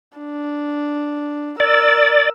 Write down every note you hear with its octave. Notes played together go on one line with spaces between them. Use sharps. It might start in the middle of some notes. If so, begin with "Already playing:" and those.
D4
A#4 D5 E6